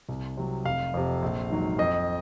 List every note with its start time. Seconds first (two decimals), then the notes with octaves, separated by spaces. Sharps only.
0.09 C2
0.37 C3 F#3
0.65 F1 F5
0.94 F2 C3
1.22 A#1
1.50 G#2 D#3 F#3
1.79 F2 D#5